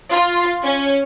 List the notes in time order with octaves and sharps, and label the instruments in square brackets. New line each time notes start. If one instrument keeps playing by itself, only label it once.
[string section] F4
C#4